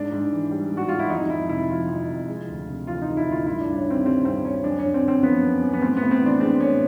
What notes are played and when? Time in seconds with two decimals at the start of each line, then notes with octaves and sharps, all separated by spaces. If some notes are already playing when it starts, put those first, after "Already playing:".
Already playing: G#2 D4
0.12 G#2
0.32 E3
0.51 G3
0.70 G#2
0.77 F#4
0.88 G#2 F4
0.99 E4
1.10 F2 D#4
1.30 F2 E4
1.49 C3 E4
1.69 F3 F4
1.89 F2
2.09 F2
2.28 G#3
2.48 D2
2.68 C3
2.87 E3 F4
3.02 G#3 D#4
3.17 E4
3.27 D2
3.32 F4
3.46 G2 E4
3.61 G2 D4
3.76 C#4
3.85 D#3 C4
4.05 G3 C4
4.24 G2 C4
4.44 G2 C#4
4.64 F#2 D4
4.79 F#2 C#4
4.94 C4
5.03 D3
5.08 C4
5.23 F3 B3
5.42 F#2
5.62 F#2
5.73 B3
5.82 A2 C4
5.97 A2 B3
6.11 C4
6.21 E3 D4
6.40 G#3 C4
6.60 A2 C#4